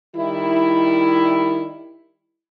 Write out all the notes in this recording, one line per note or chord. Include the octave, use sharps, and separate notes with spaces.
D#3 G3 E4